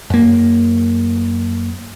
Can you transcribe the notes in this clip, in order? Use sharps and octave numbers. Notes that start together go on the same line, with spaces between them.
F#2 A#3